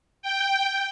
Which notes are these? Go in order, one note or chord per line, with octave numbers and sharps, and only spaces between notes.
G5